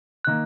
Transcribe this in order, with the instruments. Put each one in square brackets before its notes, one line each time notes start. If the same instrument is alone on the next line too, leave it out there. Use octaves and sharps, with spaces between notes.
[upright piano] D#3 A#3 [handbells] F#6